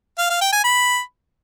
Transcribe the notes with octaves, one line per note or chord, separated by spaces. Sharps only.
F5
F5
G5
G#5
B5